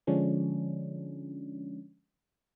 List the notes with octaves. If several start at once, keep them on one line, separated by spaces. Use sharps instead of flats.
D3 F3 G#3 C#4 D4